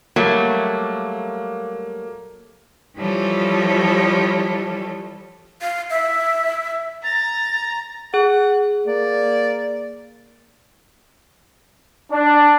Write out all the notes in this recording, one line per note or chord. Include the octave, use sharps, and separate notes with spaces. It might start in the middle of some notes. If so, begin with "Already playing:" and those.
F#3 G3 A3 A#3
E3 F3 G3 A4 C#5
F5
E5
A#5 A6
G#4 F#5
A#3 D5
D4